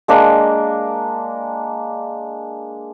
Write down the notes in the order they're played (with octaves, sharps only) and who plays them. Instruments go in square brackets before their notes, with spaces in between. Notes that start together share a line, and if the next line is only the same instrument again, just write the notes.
[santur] G#3 A#3 D4